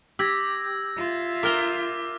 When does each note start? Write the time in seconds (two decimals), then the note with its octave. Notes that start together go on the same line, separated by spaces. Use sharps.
0.19 G4 E6 G#6 A#6
0.97 F4 E5
1.43 A#4 G5 A#5 D6 F6